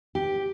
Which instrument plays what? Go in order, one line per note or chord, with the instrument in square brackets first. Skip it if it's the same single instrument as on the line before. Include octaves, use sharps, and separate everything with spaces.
[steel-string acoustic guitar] G4